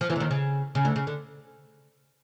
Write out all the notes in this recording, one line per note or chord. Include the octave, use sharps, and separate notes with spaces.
F3
E2 E3
D3
D#2 D#3
C#3
C#3
D2 D3
C#3
D3